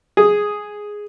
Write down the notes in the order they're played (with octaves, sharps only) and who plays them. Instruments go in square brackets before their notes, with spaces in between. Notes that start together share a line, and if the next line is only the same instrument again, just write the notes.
[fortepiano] G#4